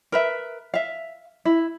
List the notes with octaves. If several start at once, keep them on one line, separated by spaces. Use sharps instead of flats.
A#4 B4 E5
E5 F5
E4